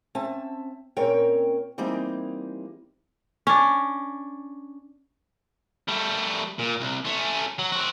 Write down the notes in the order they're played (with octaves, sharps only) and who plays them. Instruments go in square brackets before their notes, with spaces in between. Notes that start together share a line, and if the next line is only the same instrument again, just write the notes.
[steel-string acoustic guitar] C4 C#4 E5 A5
A#2 C4 C#4 A#4 C#5 G5
E3 G3 A#3 C4 D#4
[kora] C#4 D4
[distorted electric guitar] G3 A3
A#2
C2
A3 C#4
F#3
C4 F#4